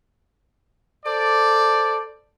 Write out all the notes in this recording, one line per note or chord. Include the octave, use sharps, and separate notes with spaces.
A4 C5 D5